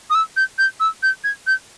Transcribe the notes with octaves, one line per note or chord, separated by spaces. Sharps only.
D#6
E6
G6
G6
E6
G6
G#6
G6